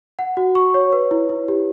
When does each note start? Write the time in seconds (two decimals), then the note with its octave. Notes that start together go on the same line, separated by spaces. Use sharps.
0.19 F#5
0.37 F#4
0.55 C#6
0.74 C#5
0.92 B4
1.11 E4
1.29 E4
1.48 G4